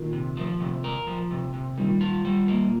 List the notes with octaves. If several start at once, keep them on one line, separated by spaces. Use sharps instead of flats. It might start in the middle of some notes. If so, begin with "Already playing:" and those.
Already playing: A#2 D#3
C3
F3
C3
A#4
F3
C3
C3
A#2 D#3 G3
F4
G3
A#3
A#2